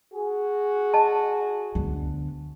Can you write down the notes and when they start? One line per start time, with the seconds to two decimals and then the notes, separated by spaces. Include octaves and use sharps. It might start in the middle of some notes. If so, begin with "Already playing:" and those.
0.13 F#4 G#4
0.94 D#5 A5
1.75 D2 B3